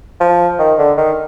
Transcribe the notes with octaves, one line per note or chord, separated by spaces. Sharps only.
F3
D#3
D3
D#3